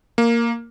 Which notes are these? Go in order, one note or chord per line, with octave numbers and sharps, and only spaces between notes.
A#3